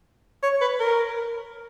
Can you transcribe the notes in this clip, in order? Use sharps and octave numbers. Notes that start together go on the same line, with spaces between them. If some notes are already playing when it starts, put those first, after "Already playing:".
C#5
B4
A#4